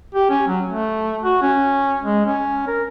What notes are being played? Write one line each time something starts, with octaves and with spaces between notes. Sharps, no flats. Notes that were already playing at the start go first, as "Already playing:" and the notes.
G4
C#4
F#3
A3
F#4
C#4
G#3
C#4
A#4